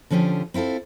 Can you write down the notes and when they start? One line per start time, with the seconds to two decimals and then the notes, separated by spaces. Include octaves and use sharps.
0.10 D3 F3 C#4 G4 G#4
0.54 C4 E4 F4 A4